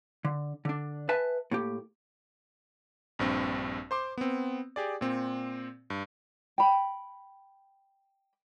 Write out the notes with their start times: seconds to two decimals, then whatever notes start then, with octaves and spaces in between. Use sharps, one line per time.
0.25 D3
0.65 D3 D4
1.09 B4 E5 G#5 A5
1.51 A2 A#3 G4
3.19 A#1 G2 C4
3.91 C5 C6 D6
4.18 B3 C4
4.76 G4 G#4 D5
5.01 A#2 C4
5.90 G2
6.58 G5 B5